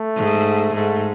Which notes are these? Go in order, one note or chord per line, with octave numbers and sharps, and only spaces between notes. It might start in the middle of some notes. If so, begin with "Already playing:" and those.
Already playing: A3
G#2
G#2 A3